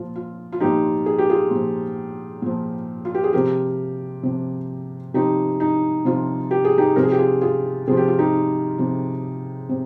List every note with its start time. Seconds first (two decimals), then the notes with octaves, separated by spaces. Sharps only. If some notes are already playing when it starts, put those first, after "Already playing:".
Already playing: A#2 F3 F4
0.15 F4
0.52 F4
0.60 A#2 F3 D#4 G4
1.06 G#4
1.18 G4
1.30 F4 G#4
1.51 A#2 F3
2.42 A#2 F3
3.05 F4
3.15 G4
3.24 G#4
3.33 C3 F3 G4 A#4
4.23 C3 F3
5.14 C3 F3 D#4 G4
5.60 D#4
6.05 C3 F3 F4
6.51 G4
6.65 G#4
6.78 D#4 G4
6.96 C3 F3 A#4
7.03 G#4
7.11 G4
7.18 F4 G#4
7.41 F4 G#4
7.88 C3 F3 G#4
7.97 G4
8.08 F4
8.19 D#4 G4
8.78 C3 F3
9.69 C3